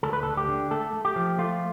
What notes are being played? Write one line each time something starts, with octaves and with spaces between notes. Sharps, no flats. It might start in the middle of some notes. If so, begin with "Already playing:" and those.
D2 A4
B4
D2 A4
G4
D3
A3 A4
A3
G4
F3
A3 F4